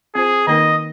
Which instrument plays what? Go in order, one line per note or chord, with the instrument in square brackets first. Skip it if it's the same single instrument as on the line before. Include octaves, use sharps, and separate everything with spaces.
[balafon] C4 F4 C5 [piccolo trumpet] G#4
[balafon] D#3 A#3 D#4 A#4 [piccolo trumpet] D#5